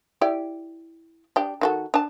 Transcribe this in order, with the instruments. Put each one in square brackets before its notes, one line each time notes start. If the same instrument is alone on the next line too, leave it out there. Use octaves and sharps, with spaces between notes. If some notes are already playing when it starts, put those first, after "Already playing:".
[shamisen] E4 G4 D5
D4 G4
D#3 F#4 A4
D4 A5